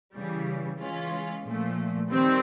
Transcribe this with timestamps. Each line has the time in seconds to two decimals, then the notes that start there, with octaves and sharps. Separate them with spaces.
0.15 C#3 E3 G3
0.80 E3 G#3 C#4 F4
1.46 A#2 F3 A3
2.10 D#3 G3 C4